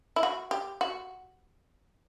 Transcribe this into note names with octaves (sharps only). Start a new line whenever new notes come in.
E4
F#4
G4
F#4